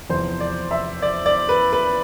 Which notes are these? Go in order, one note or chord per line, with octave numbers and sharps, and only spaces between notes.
E2 C3 F3 C5
D5
E5
D5
D5
B4
B4